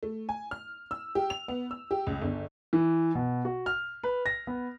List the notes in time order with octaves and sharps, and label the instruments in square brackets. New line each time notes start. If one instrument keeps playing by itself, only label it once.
[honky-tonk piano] A3
G#5
F6
E6
G4
F7
B3
E6
G4
C#2
G1
[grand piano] E3
B2
F#4
F6
B4
A#6
B3